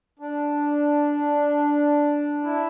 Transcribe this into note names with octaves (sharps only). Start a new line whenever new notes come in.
D4
E4